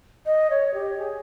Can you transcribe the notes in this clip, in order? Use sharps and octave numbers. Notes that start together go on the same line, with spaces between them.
D#5
C#5
G4
G#4